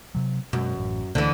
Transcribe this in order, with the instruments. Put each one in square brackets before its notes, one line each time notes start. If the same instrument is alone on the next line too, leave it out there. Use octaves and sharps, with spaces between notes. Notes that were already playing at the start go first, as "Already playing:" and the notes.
[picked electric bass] C3 F#3
[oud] F#2 [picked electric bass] B2 F#3 G#3
[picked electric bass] A1
[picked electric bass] D2 A3 [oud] D3 E3